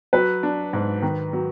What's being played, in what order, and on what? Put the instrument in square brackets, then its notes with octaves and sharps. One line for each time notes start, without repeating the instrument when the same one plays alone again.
[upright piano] F#3 [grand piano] B4
[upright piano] D4
G#2
D#3
F#3